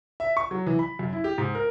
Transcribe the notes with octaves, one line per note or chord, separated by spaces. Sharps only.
E5
C#6
F#3
E3
B5
F#2
E4
G4
G#2
A#4